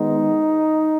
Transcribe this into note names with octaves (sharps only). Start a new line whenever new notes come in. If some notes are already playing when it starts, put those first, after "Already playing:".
Already playing: D#3 G#3 B3 D#4